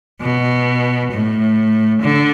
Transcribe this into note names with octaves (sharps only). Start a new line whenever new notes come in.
B2
A2
D3